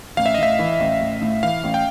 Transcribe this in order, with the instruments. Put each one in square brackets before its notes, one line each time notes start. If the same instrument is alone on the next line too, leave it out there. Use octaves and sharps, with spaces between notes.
[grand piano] A1 [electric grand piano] F5
[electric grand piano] E5
D#5
[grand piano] A2 [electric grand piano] E5
[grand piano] E3
A1
A1
A2
[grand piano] E3 [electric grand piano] F5
[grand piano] A1
[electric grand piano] G5